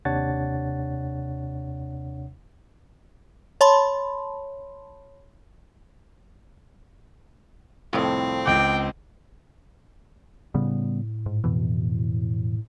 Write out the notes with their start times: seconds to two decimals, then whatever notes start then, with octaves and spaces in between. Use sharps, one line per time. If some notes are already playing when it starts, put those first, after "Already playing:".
0.05 D#2 C3 D4 C#5 F#5 A6
3.61 C#5 A5 B5 C6
7.93 C2 F2 A2 C4
8.46 C#2 G5 D6
10.54 A2 C#3 G3 B3
11.26 G#2
11.44 F2 B2 E3